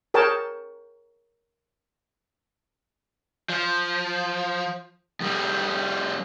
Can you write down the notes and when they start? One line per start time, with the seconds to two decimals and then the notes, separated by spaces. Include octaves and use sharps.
0.14 G#4 A#4 C#5 G5 A5
3.50 F3
5.20 F2 G3